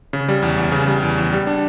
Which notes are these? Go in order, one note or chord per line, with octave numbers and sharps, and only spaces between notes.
C#3
G3
E2
E2
C#3
G3
E2
E2
G3
D4